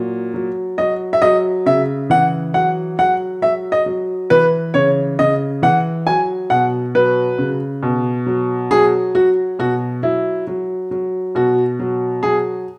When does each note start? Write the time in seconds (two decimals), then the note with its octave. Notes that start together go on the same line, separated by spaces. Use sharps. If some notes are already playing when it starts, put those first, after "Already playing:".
Already playing: A#2 F#3
0.34 F#3
0.78 F#3 D#5
1.13 E5
1.22 F#3 D#5
1.66 C#3 E5
2.10 E3 F#5
2.54 F#3 F#5
2.99 F#3 F#5
3.42 F#3 E5
3.72 D#5
3.86 F#3
4.30 E3 B4
4.74 C#3 C#5
5.19 C#3 D#5
5.62 E3 F#5
6.07 F#3 G#5
6.50 B2 F#5
6.95 F#3 B4
7.38 C#3
7.83 B2
8.26 F#3
8.71 F#3 G#4
9.15 F#3 F#4
9.59 B2 F#4
10.03 F#3 E4
10.47 F#3
10.91 F#3
11.35 B2 F#4
11.79 F#3
12.23 F#3 G#4